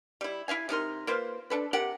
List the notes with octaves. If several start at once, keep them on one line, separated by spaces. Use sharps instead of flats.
G3 E4
E4 E5 F5 G#5
C3 D#4 A#4 C6
A#3 F4 B4 C5
D4 A4 B4
C3 G4 A#4 F#5